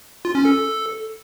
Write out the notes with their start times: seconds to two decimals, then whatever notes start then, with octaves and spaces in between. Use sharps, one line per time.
0.25 F4
0.35 C#4
0.45 A4